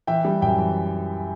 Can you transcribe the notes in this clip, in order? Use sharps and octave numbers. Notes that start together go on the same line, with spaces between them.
E3 E5 G5
G3
F#2 E5 G5
E3